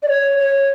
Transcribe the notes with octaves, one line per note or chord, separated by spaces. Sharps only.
D5
C#5
C#5